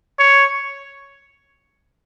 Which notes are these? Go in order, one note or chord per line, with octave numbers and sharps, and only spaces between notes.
C#5